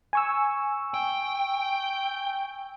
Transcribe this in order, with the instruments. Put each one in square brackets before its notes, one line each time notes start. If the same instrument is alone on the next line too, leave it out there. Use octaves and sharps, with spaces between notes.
[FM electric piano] G#5 C#6 E6
[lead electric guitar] G5